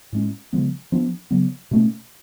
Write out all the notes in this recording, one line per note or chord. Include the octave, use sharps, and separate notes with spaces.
A2 G#3 C#4
C#3 F3 G#3 B3
F3 B3 D4
C#3 F#3 B3
B2 A3 C#4